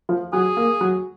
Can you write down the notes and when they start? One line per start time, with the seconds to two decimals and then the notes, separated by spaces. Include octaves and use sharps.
0.09 F3
0.33 F#3 G#4
0.57 A#3
0.81 F#3